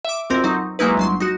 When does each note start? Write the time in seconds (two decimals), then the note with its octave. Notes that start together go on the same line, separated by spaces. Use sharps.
0.05 E5 D6
0.30 B1 F2 C4 A#4 G6
0.44 F#3 C4 D#4
0.79 F#3 G#3 A#3 D#4 E4 B4
0.97 G1 F#3 C6
1.20 D#4 F#4